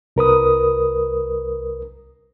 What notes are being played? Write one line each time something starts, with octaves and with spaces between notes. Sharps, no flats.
C2 A#4 B4 D#6